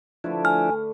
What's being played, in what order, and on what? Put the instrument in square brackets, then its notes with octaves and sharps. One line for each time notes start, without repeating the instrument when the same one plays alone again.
[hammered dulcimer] D3 A3 B4 [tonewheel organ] F3 D4 E4
[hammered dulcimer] D3 [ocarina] G#5 [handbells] F6